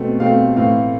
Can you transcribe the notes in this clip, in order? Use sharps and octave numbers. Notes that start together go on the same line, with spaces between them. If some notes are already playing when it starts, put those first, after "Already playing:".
Already playing: B2 A3 C4
B2 A3 C4 F5
A2 E3 A3 C4 F5